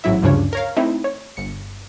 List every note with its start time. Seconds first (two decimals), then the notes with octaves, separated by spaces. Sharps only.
0.04 A1 G#2 F#3 E4 E5
0.22 D2 G2 C#3 F3 D4 C#5
0.53 A#4 C#5 F5
0.77 A3 C4 D#4 E4
1.04 C#5
1.37 G1 C#7